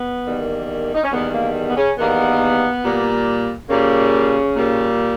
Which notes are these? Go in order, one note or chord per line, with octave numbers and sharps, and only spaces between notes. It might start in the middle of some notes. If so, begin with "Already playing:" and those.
Already playing: B3
E2 D#3 G3 A#3
D#4
C#4
E2 D#3 G3 A#3 B3
A#3
B3
C#3 C#4
E2 D#3 G3 A#3 B3
A#2 G3 A#3
A#2 C#3 G3 A#3 C#4
A#2 G3 A#3